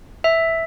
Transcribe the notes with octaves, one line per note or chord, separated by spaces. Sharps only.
E5